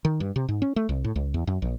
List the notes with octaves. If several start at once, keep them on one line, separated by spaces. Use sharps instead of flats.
D#3
G2
C3
G#2
C#4
A3
C2
A2
C#2
E2
F#2
A#1